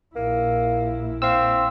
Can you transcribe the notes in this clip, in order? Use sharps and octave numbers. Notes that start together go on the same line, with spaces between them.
A#1 A#3 E4
C4 F5 E6